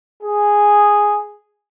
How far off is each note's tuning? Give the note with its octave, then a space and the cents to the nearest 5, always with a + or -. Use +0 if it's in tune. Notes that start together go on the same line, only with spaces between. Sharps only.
G#4 -5